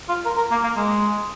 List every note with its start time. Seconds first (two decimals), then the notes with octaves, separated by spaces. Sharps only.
0.09 F4
0.26 A#4
0.38 A#4
0.51 A#3
0.64 A#3
0.76 G#3